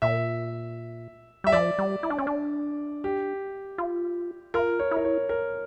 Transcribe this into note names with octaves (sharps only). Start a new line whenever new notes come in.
A#2 E5
G3 E5
F3 D5
G3
E4
D4
C#4
D4
G4
F4
F4 A#4
C#5
E4
A#4
C#5
A#4